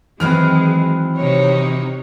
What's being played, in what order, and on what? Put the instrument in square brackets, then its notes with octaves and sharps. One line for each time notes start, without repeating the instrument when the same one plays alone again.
[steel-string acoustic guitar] D#3 E3 F#3 [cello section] G#3 G#4 [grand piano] C4 B4 F6
[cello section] C3 D#4 C#5